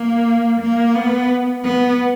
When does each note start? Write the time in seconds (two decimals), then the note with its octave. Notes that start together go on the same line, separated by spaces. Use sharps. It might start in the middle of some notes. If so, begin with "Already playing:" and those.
Already playing: A#3
0.61 A#3
0.95 B3
1.64 B3